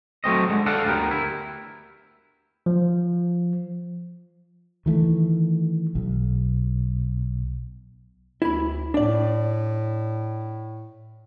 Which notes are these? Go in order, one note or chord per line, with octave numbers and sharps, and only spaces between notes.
F#3 A3 C4 D#5
D3 G#3
A4 D5 F5 F#5
D2 G3 B3 G4 A#4
E4
F3
D#3 E3 A3
B1
D2 E4 B5
A2 D4 D5